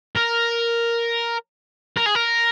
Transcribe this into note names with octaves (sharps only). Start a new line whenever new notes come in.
A#4
A#4
G#4
A#4